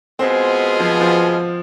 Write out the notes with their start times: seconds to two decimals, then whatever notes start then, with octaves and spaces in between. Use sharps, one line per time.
0.19 B2 G#3 B3 C4 F4 G#4
0.80 F3
1.01 F3